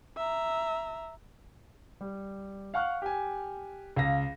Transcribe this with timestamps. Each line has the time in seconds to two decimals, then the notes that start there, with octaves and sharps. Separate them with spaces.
0.17 E5 A#5
2.01 G3
2.74 F5 F#5 C#6 F6 F#6
3.02 G4 G#5
3.96 C#2 F5 A#6